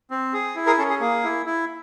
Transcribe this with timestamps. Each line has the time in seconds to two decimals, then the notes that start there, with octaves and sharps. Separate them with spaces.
0.11 C4
0.33 G#4
0.56 E4
0.66 G#4 A#4
0.78 C#4 A4
0.90 G#4
1.00 A#3 G#4
1.24 E4
1.46 E4